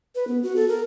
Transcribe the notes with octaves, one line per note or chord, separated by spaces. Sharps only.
B4
B3
F#4
A4
A#4